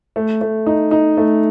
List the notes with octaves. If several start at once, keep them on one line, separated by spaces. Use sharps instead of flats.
A3
A3
D#4
D#4
A3